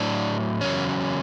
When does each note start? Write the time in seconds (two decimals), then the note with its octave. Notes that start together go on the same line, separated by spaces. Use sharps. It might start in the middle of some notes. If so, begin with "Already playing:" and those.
Already playing: A2 F#3 D4
0.61 E2 C#3 F#3 C#4